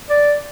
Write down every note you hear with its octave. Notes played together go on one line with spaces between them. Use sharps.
D5